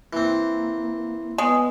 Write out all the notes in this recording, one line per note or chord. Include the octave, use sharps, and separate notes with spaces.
E3 A#3 C4
G#3 B3